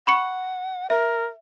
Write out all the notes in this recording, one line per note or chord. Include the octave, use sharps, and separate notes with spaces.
F#5 B5 C#6 C#7
A#4 E5